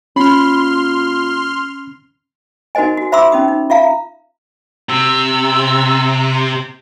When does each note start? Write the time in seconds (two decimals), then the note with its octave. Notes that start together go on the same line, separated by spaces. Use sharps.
0.16 A#2 C#4 B5 C6 F6
2.75 D#4 F#4 A#4 C5 D#5 G#5
2.97 F#4
3.12 C5 E5 B5 C6 D6 E6
3.32 C#4 D#4 D#6
3.48 D#4
3.70 F4 E5 F5 A#5
4.89 C3 E6